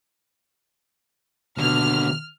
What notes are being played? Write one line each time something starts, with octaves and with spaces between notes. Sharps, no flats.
D#2 B2 D3 F6